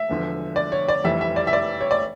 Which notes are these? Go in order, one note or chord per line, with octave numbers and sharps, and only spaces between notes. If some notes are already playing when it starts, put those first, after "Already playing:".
Already playing: E5
E1 E2 D3 F3
D5
C#5
D5
F1 F2 E3 G3 E5
E5
D5
E5
D5
C#5
D5